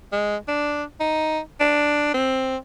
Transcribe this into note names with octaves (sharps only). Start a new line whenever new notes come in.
G#3
D4
D#4
D4
C4